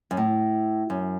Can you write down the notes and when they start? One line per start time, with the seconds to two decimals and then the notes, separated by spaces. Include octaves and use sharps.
0.11 F#2
0.17 A2
0.90 F#2